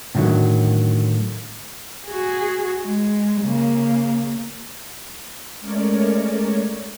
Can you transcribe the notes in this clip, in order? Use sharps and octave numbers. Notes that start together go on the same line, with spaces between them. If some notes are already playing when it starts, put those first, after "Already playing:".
A2 D3 D#3 F3 F#3
F#4 G#4
G#3
C#3 A#3
G#3 A3 C#4 A#4 C#5 D5